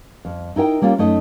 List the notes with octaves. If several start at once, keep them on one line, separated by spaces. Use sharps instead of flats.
F2
D#4 E4 A#4 G5
G3 A#3 C#4 F4
F#2 A3 D#4 D#5